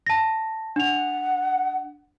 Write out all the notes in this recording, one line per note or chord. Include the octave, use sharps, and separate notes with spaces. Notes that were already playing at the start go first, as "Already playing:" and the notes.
A5 A#6
D4 F#5 F7